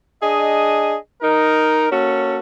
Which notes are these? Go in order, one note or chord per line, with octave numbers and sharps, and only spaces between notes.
D4 G#4 D#5
D#4 A#4
A#3 C#4 F#4 A4